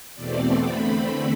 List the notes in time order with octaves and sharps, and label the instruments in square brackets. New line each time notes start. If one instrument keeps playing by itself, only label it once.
[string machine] E2 B2 A3 C4 D5
E2 D3 A3 C4 B5